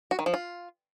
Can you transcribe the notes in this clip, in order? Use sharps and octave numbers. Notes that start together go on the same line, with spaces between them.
F#4
D#3
F3
F4